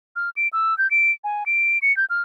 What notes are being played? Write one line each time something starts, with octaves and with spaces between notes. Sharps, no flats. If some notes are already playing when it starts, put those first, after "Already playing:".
F6
D7
E6
G6
D7
G#5
D7
C#7
G6
F6